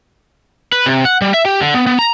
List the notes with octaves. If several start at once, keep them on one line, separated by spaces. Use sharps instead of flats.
B4
C3
F#5
G3
E5
G4
D3
B3
B3
A#5